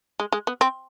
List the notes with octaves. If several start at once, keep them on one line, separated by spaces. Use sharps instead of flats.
G#3
G#3
B3
C4